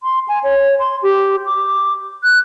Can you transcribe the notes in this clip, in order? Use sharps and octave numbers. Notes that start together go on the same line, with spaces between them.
C6
G#5
C#5
C6
G4
D6
F#6